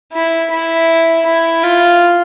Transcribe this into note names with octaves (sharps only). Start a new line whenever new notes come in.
E4
E4
E4
F4